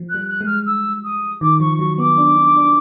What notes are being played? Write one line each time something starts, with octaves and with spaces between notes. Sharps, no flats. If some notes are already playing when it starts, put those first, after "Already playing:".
Already playing: F3
F#6
G3
F#6
G#3
F6
E6
D#6
D#3 D6
F3 C#6
F#3 C#6
B3 D6
D4
D4
D4